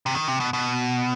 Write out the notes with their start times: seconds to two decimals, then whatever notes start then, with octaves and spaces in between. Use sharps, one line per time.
0.06 C3
0.15 D#3
0.28 C3
0.40 B2
0.53 B2